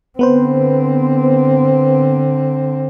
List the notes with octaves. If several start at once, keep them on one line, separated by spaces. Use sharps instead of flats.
D3 B3 C4 B4 C5